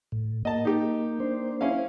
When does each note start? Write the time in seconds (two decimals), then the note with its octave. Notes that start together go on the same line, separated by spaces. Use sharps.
0.12 A2
0.45 A#3 D#5 A5
0.65 D#4 G4
1.20 A#3 D4 C5
1.61 C#4 E4 F5